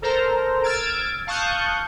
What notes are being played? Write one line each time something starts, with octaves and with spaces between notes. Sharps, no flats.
A4 A#4 C5 A#5
E6 F6 G#6 A6 D7
F5 A5 C#6 D#6 F#6 G6